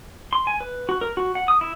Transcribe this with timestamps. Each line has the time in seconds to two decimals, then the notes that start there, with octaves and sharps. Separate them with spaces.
0.33 C6
0.47 G#5
0.61 B4
0.89 F#4
1.01 A#4
1.17 F#4
1.35 F#5
1.48 D#6
1.61 E4